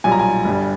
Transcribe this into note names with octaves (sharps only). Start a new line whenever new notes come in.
B1 A#2 G3 G#5
A#5
G#5
G1 G2 G3